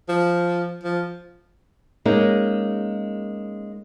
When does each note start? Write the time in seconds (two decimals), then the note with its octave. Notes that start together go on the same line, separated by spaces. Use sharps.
0.09 F3
0.83 F3
2.05 G#3 A#3 C#4 D#4